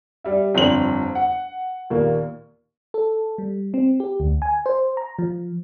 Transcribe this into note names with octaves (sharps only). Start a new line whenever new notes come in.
G3 E5
G1 F2 C4 D4 F#7
F#5
D#2 A#2 A#3
A4
G3
C4
G4
D2
G#5
C5
A#5
F3